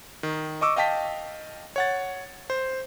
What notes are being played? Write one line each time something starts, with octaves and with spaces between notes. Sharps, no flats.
D#3
D#5 C#6 D6 E6
D#5 F5 G5 A5 B6
C#5 F#5 A6
C5